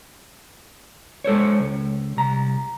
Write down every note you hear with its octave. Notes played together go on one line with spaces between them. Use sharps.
G#3 A4 C5 C#5
C#2
C2 A#5